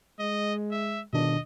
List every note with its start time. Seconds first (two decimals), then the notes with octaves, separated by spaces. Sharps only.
0.19 G#3 D#5
0.71 E5
1.13 G1 B2 D#3 D4 D#5